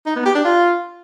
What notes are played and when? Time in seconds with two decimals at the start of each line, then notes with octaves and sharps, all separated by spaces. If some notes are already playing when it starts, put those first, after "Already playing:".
0.06 D#4
0.16 B3
0.25 G4
0.35 D4
0.44 F4